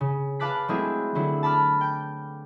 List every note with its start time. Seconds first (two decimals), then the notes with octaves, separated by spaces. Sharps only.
0.01 C#3
0.40 B4 F5 A5 D6 F#6 B6
0.68 F#3 G#3 A3 C4 E4 G#4
1.15 D3 F#3 E4
1.43 A5 B5 D6 F6
1.81 G5